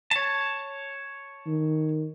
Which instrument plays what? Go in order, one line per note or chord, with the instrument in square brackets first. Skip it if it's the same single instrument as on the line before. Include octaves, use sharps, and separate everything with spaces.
[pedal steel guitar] C#5 A5
[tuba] D#3